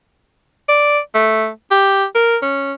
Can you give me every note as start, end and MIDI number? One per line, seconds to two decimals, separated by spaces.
0.69 0.99 74
1.14 1.49 57
1.71 2.05 67
2.15 2.37 70
2.43 2.73 61